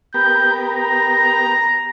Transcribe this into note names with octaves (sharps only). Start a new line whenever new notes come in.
B3 G4 A#4 G6
A#5